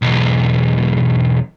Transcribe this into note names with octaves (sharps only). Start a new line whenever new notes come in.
B1 E2